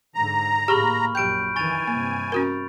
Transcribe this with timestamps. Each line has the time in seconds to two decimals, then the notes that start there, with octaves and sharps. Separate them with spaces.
0.15 G#2 D3 A#5
0.68 A2 A#3 G4 G#4 B5 C#6 F6
1.15 A#1 F#2 G4 G5 G6 D7
1.56 F2 D#3 E3 G#5 C#6 A6 F7
1.88 G2 C3 A#3
2.32 C#4 F#4 A#4